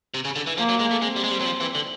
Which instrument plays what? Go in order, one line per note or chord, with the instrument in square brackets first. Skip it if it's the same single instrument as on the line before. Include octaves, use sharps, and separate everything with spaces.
[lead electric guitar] C3
C#3
D3
E3
[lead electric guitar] F3 [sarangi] A#3
[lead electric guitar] F#3
G#3
A3
[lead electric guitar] G#3 [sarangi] C4
[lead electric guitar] G3
G#3
G3
F#3
F3
E3
D3